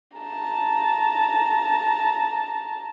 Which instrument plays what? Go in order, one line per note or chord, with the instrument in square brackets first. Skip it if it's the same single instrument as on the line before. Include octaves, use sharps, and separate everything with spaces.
[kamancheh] A5 A#5